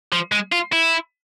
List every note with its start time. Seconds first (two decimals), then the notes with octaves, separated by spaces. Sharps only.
0.12 F3
0.32 G#3
0.52 F4
0.73 E4